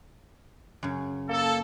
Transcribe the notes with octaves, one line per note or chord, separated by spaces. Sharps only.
F#2 C#3
A#3 A4